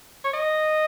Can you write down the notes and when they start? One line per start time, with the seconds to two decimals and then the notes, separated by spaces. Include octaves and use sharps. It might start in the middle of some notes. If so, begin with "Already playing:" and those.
0.24 C#5
0.33 D#5